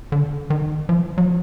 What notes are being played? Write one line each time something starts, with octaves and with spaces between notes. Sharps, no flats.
D3
D#3
F3
F#3
F3